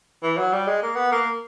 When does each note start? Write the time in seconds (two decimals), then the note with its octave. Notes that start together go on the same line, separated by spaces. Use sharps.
0.23 E3
0.37 F#3
0.53 G3
0.67 G#3
0.82 A#3
0.96 B3
1.12 A#3